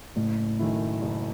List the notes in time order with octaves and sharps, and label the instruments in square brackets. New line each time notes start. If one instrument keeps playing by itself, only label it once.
[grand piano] F#1 [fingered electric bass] A2
[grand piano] F#2 D#3 A3 E4
F#1